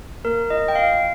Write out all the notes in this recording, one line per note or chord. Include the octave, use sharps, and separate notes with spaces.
A#3 A#4
F4 D#5
G5
F4 F5